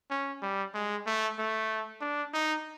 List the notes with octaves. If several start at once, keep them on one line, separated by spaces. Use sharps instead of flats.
C#4
G3
G#3
A3
A3
D4
D#4